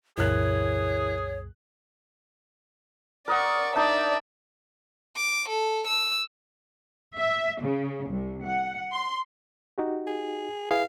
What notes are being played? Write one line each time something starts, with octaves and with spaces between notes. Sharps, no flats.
C2 F#2 A#2 E3 G#4 A#4 C#5 F#6
A#4 D5 D#5 F#5 C#6
D4 D#4 D5 E5 D6
D6
A4
E6
E5
C#3
C2
F#5
C6
D#4 F#4 G4
G#4
E4 G#4 B4 F5